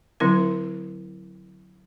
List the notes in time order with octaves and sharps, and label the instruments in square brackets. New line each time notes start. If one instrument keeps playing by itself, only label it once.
[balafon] D3 F#3 C4 E4 A#4